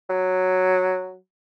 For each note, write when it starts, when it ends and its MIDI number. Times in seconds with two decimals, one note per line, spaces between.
0.10 1.15 54